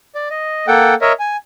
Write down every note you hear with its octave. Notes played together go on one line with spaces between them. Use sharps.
D5
D#5
A#3 A4 F#5 G5
A#4 C#5 D#5 E5
G#5